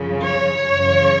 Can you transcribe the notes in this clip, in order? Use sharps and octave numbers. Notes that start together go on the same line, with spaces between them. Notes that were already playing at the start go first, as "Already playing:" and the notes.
Already playing: F#2 C#3 F3
C#5
F#2 C#3 E3